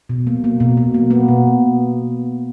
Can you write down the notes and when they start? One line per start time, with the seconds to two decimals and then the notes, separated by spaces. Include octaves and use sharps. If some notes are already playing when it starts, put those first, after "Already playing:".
0.09 B2
0.27 A#3
0.44 A#3
0.60 B2
0.77 B2
0.94 A#3
1.10 A#3 B3
1.28 B2